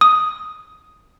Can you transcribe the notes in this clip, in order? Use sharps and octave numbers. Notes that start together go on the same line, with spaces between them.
D#6